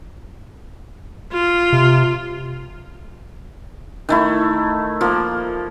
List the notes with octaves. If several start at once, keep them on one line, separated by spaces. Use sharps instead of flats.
F4
C3
D#3 A3 E4
F3 A#3